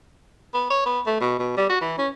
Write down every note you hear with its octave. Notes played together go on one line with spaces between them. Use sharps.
B3
C#5
B3
A3
B2
B2
G3
F#4
E3
C#4